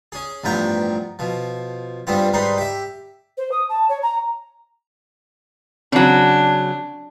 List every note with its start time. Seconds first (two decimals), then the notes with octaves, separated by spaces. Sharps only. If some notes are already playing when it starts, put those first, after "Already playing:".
0.12 C#4 G#4
0.44 A1 G2 F3 B3 G5 A#5
1.19 B2 F3
2.07 G2 G3 B3 C4 F4
2.33 G#2 G3 D#4 B4 C6
2.58 G4 E5
3.37 C5
3.51 D#6
3.69 A5
3.89 C#5
4.02 A#5
5.92 C#3 F#3 C4 D4